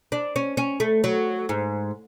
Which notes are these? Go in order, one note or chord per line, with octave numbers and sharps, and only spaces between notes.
D4
C#4
C#4
A3
F#3
G#2